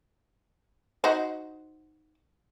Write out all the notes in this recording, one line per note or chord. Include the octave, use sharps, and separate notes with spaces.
D#4 F#4 C5